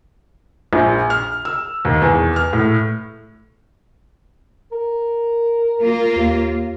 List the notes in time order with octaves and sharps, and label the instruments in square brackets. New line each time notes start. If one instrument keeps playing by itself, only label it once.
[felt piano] A#1
F6
E6
D#2
E2
F6
A2
[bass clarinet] A#4
[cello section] A#3 F4
[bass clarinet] D#2